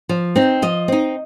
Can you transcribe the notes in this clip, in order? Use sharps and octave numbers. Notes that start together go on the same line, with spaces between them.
F3
C4 D#4
F3 D#5
C4 D#4